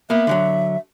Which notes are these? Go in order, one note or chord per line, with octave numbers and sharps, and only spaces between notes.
A#3 B3 E5
D3 E3 F#3